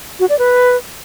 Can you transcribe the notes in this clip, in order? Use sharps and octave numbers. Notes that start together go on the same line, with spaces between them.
F#4
D5
B4